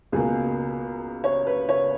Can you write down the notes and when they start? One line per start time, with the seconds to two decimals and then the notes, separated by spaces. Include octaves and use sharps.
0.12 C#2 B2 A#3 G#4
1.24 C#5
1.47 B4
1.69 C#5